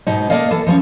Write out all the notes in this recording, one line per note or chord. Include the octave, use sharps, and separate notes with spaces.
G#2 B2 D#4
A#3 A4 D5 D#5 F5
E3 A4
E3 F3 B3 C#4